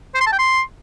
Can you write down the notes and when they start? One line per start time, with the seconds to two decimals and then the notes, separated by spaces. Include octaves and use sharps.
0.15 C5
0.21 C6
0.27 A5
0.33 G5
0.39 C6